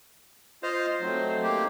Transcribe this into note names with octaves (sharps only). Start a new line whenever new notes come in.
F4 C5 D#5 F5
F#3 A3 C4 D#4
A#3 G4